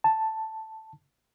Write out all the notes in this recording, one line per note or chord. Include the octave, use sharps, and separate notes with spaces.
A5